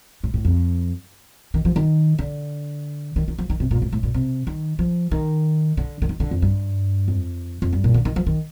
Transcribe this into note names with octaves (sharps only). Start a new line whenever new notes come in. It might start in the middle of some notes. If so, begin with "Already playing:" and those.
A2
A2
F2
D#3
F3
D#3
D3
D#3
D#3
F3
D#3
C3
A#2
A2
A2
A#2
C3
D#3
F3
D#3
D3
D3
D#3
D3
F2
G2
F2
F2
G2
A#2
D3
D#3
F3
D#3